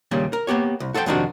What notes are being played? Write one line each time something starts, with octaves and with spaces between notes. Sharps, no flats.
D#2 A#2 C#3 G3
A#4
A#3 B3 G4 C#5
C2
F#4 A4 C5 D#5 G5
F2 C3 D#3 D4 D#4 F#4